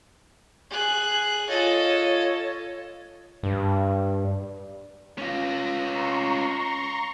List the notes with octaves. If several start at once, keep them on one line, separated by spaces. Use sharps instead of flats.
G#4 F#6
F4 A4 C#5 D#5
G2
C#4 F4 A#6
A#5 C6 C#6